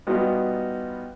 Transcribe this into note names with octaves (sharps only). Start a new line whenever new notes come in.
G3 B3 D#4 F4 F#4